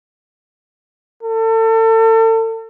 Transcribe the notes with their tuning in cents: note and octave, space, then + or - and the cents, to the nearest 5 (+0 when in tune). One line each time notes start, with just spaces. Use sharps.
A4 +35